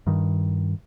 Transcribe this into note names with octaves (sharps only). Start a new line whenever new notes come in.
G2 D#3